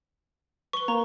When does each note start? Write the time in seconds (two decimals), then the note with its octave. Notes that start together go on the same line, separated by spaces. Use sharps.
0.73 B4 C#6 G7
0.88 A#3 A#5